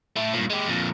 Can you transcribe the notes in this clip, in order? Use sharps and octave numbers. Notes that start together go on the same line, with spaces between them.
A3 E4
G2 A#2
G#3 G4
F2 A#2